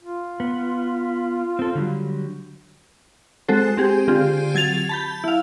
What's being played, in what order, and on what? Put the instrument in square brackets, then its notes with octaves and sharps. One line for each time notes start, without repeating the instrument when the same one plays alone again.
[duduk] F4
[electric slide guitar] B3
C4 A4
D3 F#3 G3
[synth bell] G#3 C4 F#4 A4 C5
C4 G4 G#4
D3 C4 F4 G4 G#4
F#3 G#6 A6 F7
A5 B5 G6
E4 F5